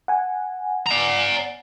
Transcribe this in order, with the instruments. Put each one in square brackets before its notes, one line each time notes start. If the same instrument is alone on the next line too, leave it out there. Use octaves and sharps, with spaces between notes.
[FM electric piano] F#5 G#5
[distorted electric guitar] D5 A#5